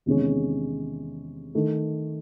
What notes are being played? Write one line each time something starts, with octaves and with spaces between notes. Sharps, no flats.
E2 C3 D#3 G#3 C#4
D#3 A3